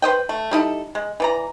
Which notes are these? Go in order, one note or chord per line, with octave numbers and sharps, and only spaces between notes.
B4 C5 D#5 G5
A3
G3 D#4 E4 A4
G#3
E3 D5 A#5